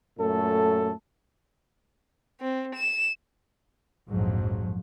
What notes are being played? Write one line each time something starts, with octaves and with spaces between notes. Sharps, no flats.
F#2 A#2 A3 A4
C4
E7
A#1 F2 G#2 F3 F#3